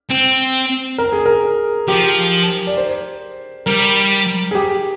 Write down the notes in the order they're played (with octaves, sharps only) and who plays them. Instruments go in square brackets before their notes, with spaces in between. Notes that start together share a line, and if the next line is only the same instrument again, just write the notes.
[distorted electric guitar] C4
[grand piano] A#4
G#4
A#4
[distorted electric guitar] F3 [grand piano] G4
[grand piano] D5
C5
[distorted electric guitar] G3 [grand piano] A#4
[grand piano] G#4
G4